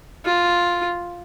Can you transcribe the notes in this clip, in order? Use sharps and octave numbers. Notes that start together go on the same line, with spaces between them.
F4